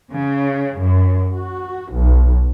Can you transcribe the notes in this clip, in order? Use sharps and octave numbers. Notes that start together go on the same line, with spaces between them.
C#3
F#2
F#4
B1